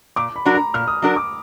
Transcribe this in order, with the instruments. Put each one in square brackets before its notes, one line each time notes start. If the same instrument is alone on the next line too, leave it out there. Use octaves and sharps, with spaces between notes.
[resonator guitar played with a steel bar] A#2 [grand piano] D6
[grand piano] B5
[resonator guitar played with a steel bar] F#3 D4 F#4 A#4
[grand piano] A#5
[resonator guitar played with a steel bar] A#2 [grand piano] F6
[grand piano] D#6
[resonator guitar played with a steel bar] F#3 D4 F#4 A#4
[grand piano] D6